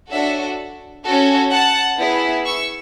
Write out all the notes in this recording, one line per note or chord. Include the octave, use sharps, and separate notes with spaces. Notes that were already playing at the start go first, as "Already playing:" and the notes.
D4 F#4 A4 C#5 E5
C#4 F#4 A4
F#5 A5
B3 E4 G#4
C#6 E6